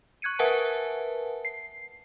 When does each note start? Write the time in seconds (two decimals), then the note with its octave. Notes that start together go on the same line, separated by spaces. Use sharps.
0.22 C#6 F#6 G#6 C#7 D#7
0.39 A#4 B4 E5 F#5 G#5 A5
1.45 C7